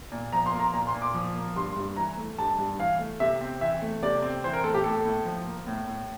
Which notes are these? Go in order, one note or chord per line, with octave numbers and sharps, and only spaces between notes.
A#2
F3 A#5
C6
A#3
A#5
A#2 A#5
C6
A#2
D6
F3
A#3
G2 C6
G2
E3 A#5
A3
G2 A5
G2
E3 F5
A3
C3 E5
C4
E3 E5
A3
C3 D5
C4
E3 C5
A#4
A3 A4
G4
A2 A4
A2
F3
A#3
A2
A2